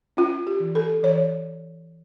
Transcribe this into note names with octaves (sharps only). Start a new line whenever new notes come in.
C#4 F4
G4
E3
A4
E3 C#5